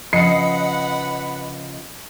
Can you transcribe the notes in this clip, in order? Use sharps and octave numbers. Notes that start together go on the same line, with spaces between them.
C#3 F3 B4 D#5 F#5 C7 C#7